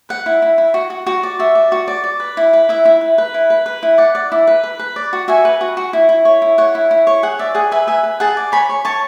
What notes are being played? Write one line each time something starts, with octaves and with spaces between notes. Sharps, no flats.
B4 F#5
E4
E4
E4
F#4
F#4
F#4
D5
F#4 E5
D5
F#4
D5
D5
B4
E4
B4
E4 E5
E4
B4
B4
E4
B4
B4
E4
D5 F#5
D5
E4
B4
B4
B4
D5
F#4
F#4 E5 G#5
B4
F#4
F#4
E4
E4
C#5
E4
C#5 F#5
E4
E4
C#5
G#4 F#5
D5 E5
G#4 F#5
B4 E5 G#5
B4 E5 G#5
B4
G#4 F#5 A5
D5
C#5 G#5 B5
C#5
C#5 A5 C#6